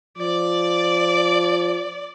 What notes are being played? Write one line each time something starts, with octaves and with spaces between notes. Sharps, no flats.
F3 D5